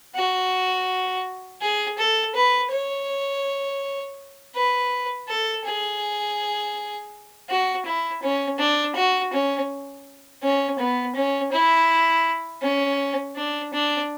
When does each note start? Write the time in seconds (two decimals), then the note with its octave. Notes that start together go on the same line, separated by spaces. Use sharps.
0.15 F#4
1.62 G#4
1.98 A4
2.35 B4
2.71 C#5
4.55 B4
5.28 A4
5.65 G#4
7.49 F#4
7.85 E4
8.22 C#4
8.59 D4
8.96 F#4
9.33 C#4
10.43 C#4
10.79 B3
11.15 C#4
11.52 E4
12.62 C#4
13.36 D4
13.73 D4